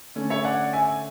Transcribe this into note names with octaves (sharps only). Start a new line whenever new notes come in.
D3 A3 C#4
C#5 E5
D5 F#5
E5 G#5